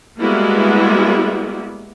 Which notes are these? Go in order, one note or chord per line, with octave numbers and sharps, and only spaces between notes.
G3 G#3 A#3 B3 E4 F#4